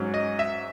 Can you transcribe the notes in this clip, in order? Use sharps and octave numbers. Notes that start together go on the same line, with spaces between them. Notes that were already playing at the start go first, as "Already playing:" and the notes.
Already playing: G#2 F#3 C#4
D#5
E5